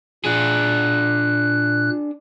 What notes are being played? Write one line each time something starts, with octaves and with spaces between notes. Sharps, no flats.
A#2 D4 G#4 F#6